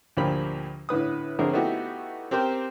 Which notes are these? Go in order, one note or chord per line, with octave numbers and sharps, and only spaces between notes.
D2 A#2 F3 G4 A#4 B5
A2 D3 B4 D#6
A#1 D3 C4 G#4 A#4 C#5
A3 B3 D#4 E4 F#4 G4
C4 G4 A#4 C5